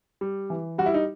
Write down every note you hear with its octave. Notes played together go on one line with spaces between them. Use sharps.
G3
E3
G3 F#4
E4
D#4